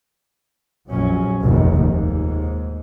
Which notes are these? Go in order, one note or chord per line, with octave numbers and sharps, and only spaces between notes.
A#1 F2 F#3 C#4
F1 A#1 D#2 A2 D#3
D#2 G#2